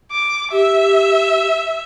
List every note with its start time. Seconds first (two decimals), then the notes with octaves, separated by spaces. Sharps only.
0.12 D6
0.52 G4 E5